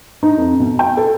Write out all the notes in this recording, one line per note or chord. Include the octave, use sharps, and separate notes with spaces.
D#4
F2
B2
G5
A4